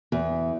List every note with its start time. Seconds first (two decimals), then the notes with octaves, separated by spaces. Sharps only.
0.12 E2